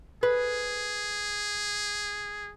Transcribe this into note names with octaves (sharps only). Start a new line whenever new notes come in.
G#4 B4